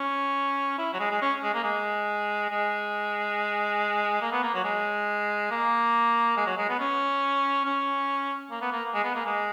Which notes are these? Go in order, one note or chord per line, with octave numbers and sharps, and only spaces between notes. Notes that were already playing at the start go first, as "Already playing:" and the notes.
Already playing: C#4
E4
F#3
G#3
G#3
C#4
G#3
A#3
G#3
G#3
A#3
B3
A#3
F#3
G#3
A#3
G#3
F#3
G#3
B3
C#4
C#4
A#3
B3
A#3
G#3
B3
A#3
G#3